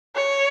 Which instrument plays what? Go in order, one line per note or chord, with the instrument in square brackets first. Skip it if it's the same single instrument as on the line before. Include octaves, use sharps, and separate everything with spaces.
[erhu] C#5